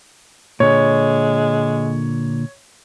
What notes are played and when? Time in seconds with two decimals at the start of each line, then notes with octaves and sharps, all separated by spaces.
0.60 A#2 D3 G#3 C#5